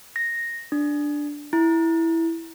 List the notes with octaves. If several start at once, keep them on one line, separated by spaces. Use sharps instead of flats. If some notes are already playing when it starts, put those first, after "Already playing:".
A#6
D4
E4